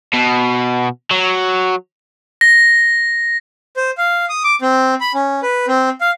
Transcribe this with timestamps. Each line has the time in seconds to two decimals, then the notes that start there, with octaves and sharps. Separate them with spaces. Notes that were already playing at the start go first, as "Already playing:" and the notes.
0.13 B2
1.11 F#3
2.41 A#6
3.77 C5
3.98 F5
4.29 D#6
4.44 D6
4.62 C4
5.01 B5
5.15 C#4
5.43 B4
5.68 C4
6.01 F5